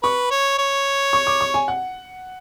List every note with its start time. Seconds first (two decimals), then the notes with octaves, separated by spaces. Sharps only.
0.03 B4 C#6
0.31 C#5
0.59 C#5
1.13 C#6
1.27 D6
1.41 C#6
1.54 G#5
1.68 F#5